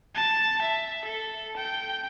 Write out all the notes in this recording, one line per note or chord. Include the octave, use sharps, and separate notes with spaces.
A5
E5
A4
G5